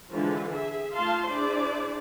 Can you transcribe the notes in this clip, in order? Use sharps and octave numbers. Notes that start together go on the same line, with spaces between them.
D3 E3 F3 G#3
G#4 E5
A3 D#4 F4 F5 A5 C6
D4 E4 G#4 C5 D5